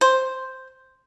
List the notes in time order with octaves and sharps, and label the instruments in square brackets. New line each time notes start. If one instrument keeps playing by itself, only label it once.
[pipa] C5